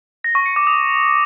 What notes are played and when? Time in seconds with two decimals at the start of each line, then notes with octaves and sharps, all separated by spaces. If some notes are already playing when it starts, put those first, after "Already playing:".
0.24 A#6
0.35 C#6
0.46 C#7
0.56 D6
0.67 D#6